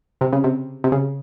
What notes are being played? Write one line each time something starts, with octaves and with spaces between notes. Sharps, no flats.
C3
C#3
C3
C3
C#3